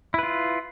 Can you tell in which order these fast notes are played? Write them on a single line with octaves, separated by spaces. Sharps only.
E4 B4 F4